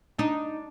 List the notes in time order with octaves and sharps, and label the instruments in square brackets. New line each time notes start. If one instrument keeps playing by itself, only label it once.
[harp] D4 [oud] D#4